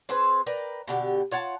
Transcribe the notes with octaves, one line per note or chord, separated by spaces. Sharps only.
C4 G#4 B4 C5
A#4 B4 D5 G5
B2 D3 G4
F4 C#5 F#5 A5